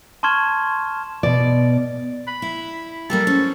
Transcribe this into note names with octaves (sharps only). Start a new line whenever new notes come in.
A5 C6 C#6 F6 G#6 E7
B2 D5
B5
E4
G3 A#3 G4 A4
C#4 C5